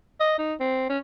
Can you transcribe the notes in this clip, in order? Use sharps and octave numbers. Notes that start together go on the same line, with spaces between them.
D#5
D#4
C4
C#4